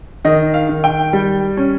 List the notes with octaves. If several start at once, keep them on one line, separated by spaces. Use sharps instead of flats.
D#3 D#5
F5
D#3
G5
G3
C#4